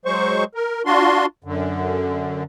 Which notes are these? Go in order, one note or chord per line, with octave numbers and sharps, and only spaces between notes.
F#3 G#3 C5 C#6
A#4
D4 F4 F#4 C6
F#2 D3